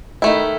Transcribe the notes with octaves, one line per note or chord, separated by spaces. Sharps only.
D#3 A3 E4